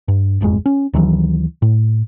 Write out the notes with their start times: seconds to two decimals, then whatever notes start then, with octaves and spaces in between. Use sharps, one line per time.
0.08 G2
0.41 D#1 G#1 F2 G#3
0.66 C#4
0.94 D2 D#3 E3 F#3
1.62 A2